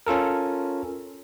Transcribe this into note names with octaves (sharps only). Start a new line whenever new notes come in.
C#4 F4 A4 A#4